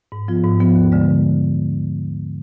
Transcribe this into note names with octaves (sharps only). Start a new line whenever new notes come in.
G#2
F3 B3 F4
G#2
F3 B3 F4
D#2
D3 G#3